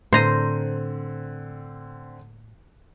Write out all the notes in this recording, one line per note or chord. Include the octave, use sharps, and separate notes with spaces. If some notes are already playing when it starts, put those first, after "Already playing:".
A2 D3 C4 C5 A#5 D#7